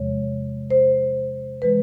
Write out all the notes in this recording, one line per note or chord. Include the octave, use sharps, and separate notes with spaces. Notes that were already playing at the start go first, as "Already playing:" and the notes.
Already playing: E2 C3 F3 G#3 C#5
C5
E3 G#3 B4